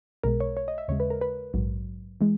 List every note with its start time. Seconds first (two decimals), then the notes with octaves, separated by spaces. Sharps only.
0.24 B1 B2 G#3 A#4
0.40 C#5
0.57 C#5
0.68 D#5
0.78 E5
0.88 D#2 C#3 G#3 C#5
1.00 B4
1.10 A#4
1.21 B4
1.54 A#1 G#2 F#3
2.21 E3 G#3